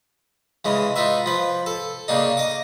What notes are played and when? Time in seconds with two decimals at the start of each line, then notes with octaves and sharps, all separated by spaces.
0.65 C#3 E3 G#3
0.96 D#4 F4 B4 E5
1.26 F3 B4
1.66 A4
2.08 C#3 A#3 D4 D#4
2.37 D#5 D6